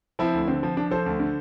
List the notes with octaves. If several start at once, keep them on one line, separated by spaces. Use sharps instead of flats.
F3 C4 E4
D2
D3 C4
F3
F3 D4
F3 A4 C5
D2
D3